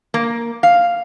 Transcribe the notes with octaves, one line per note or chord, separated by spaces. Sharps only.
A#3
F5